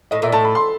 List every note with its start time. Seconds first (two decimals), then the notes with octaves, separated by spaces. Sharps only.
0.11 A2 D#5
0.22 A#2 E5
0.32 A2 A5
0.45 B5
0.55 C6